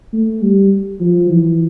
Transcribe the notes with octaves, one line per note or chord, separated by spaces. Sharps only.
A3
G3
F3
E3